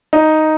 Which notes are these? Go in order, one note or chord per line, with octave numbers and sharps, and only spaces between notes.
D#4